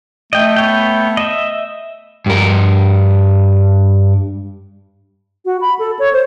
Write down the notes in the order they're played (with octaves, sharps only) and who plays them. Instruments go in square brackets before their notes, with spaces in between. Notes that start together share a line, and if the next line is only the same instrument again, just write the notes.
[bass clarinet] A3 [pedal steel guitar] D#5 G5
[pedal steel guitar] B3 C#5 G5
D#5 E5
[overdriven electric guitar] G2 A#4
[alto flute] F#4
B5
A4
C#5
C5